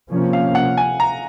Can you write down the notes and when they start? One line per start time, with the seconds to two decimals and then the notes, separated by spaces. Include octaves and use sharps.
0.11 C3 F3 A#3 C#4
0.33 F5
0.55 F#5
0.78 G#5
1.00 A#5